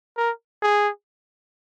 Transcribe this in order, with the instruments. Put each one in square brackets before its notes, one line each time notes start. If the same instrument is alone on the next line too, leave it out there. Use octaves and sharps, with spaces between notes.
[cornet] A#4
G#4